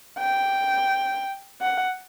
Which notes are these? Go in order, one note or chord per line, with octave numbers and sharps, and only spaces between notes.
G5
F#5